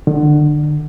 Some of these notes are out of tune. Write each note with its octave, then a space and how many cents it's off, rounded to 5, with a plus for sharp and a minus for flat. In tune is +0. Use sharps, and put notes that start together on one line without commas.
D3 +25